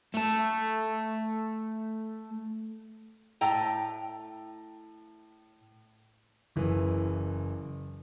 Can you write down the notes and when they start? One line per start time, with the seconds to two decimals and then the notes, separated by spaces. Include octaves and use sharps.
0.14 A3 A4
3.41 A2 G5 A#5
6.56 F#1 E3